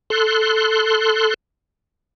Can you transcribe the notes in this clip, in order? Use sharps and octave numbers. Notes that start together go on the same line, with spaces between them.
A4 C6 F#6